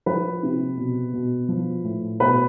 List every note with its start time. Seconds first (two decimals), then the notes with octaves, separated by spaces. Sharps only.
0.06 F3 B4
0.43 C3
0.77 B2
1.14 B2
1.48 F3
1.84 A2
2.20 B2 B4